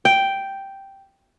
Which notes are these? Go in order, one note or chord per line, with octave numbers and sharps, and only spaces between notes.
G5